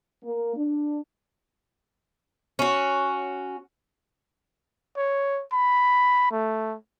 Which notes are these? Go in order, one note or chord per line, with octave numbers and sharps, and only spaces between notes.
A#3
D4
C#4 F#4
C#5
B5
A3